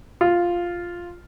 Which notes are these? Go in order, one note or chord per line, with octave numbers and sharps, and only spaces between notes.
F4